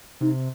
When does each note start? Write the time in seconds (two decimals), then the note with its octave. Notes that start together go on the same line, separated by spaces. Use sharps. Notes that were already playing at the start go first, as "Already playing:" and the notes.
0.21 C3 D#4